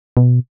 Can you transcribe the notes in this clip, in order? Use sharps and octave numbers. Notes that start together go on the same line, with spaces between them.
B2